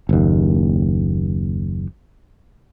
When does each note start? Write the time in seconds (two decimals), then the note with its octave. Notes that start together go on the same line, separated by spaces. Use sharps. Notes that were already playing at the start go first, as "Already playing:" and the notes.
0.09 F#1 D#2